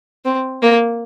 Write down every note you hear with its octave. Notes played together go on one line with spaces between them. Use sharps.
C4
A#3